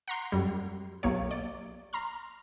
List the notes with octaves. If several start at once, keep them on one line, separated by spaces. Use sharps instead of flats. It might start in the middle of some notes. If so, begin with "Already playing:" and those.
F#5 A#5 C6
F#2 G3
B1 A#3 G4 C#5
D5
A#5 C6 F6